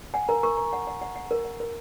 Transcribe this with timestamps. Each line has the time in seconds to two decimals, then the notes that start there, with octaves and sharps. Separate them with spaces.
0.14 F#5 G#5
0.28 A#4 A#5
0.43 A#4 C#6
0.57 A#4 A#5
0.73 F#5
0.87 F#5
1.02 F#5
1.16 F#5
1.31 A#4
1.45 F#5
1.60 A#4